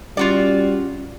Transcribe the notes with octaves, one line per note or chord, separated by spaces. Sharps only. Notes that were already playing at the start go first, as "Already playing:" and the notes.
G3 C#4 F4 F#4 D5